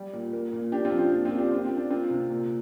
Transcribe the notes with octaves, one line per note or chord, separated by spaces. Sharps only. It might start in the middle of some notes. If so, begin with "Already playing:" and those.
Already playing: G3
A#2
A#3
A#2
A#3 D4 G4
C4 F4
F3
C4
A#2 D4
C4 F4
A#3
D4 G4
A#3 C4 F4
C4
A#3
D4
A#3 C4 F4
C3
A#2